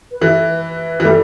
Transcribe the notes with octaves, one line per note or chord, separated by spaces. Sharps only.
B4
E3 A4
B4
E3
G3 A4